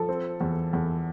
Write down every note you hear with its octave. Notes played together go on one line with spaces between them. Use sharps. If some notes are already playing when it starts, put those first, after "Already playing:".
Already playing: F3 A4
C4
E2
E2